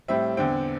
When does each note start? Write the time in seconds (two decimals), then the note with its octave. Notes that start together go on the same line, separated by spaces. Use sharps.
0.08 A2 G3 C4 E5
0.37 E2 D3 C4 G5